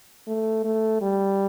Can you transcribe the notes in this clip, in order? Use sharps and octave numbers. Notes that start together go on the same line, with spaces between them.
A3
A3
G3